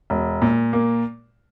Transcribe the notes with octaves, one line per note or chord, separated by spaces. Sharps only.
E1
A#2
A#3